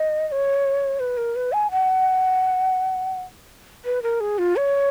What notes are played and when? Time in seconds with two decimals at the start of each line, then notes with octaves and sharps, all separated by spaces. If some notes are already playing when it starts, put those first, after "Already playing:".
Already playing: D#5
0.28 D#5
0.32 C#5
1.00 B4
1.17 A#4
1.36 B4
1.53 G#5
1.71 F#5
3.85 B4
4.03 A#4
4.20 G#4
4.39 F4
4.56 C#5